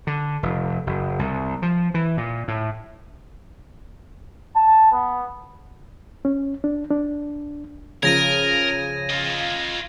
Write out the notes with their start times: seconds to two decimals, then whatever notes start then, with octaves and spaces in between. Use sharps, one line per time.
0.07 D3
0.43 F1
0.87 F#1
1.19 C2
1.62 F3
1.94 E3
2.17 A#2
2.48 A2
4.56 A5
4.92 B3
6.25 C#4
6.64 D4
6.90 D4
8.03 C#3 F3 A#4 G#6 A#6 D#7
9.10 F4 D#5